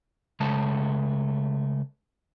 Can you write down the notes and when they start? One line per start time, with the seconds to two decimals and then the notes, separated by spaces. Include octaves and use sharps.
0.40 C#3 G#3 A3 A5